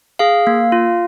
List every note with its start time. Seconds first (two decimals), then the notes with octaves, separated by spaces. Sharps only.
0.19 G#4 F5
0.47 A#3
0.72 F4